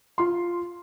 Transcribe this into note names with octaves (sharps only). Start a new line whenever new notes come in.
F4 C6